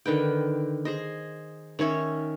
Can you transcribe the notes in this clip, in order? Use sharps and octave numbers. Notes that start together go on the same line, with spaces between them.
D3 D#3 B4 G5
G#4 C5 D#5
D#3 C#4 C#5 E5